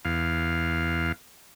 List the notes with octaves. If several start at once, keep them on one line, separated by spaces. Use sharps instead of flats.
E2 F5